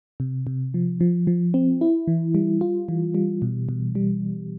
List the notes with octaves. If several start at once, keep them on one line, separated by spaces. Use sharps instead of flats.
C3
C3
F3
F3
F3
C4
E4
E3
G3
F4
E3
G3
B2
B2
G3